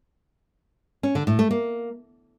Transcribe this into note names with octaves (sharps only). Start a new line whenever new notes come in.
C#4
D3
A2
A3
A#3